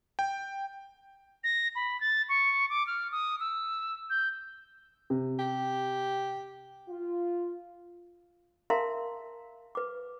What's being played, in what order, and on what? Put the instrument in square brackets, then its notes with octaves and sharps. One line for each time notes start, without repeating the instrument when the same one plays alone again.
[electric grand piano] G5
[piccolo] A#6
B5
A6
C#6
D6
F6
D#6
E6
G6
[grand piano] C3
[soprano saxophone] G4
[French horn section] F4
[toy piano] A#4 E5 F5 A5 A#5 C6
B4 D6